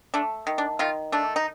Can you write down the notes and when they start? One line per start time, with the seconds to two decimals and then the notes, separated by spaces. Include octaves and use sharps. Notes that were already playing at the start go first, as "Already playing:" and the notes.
0.14 A3 D4
0.47 D#3
0.58 D4
0.79 D#3 F4
1.12 A3 D4
1.36 D#4